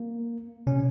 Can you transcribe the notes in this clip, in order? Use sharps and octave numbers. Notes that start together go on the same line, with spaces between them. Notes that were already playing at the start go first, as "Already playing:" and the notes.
Already playing: A#3
C3 C#4